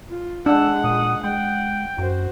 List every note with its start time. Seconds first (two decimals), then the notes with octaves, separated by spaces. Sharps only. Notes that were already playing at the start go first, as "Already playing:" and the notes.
0.10 F4
0.46 G#3 D4 F#5 E6
0.84 A#2 D#6
1.24 G#3 F#5 G5
1.98 F#2 F#4 C5